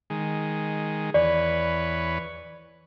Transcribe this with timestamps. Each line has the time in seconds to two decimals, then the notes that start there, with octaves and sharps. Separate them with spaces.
0.10 D#3 G#3
1.14 E2 B4 C#5 D5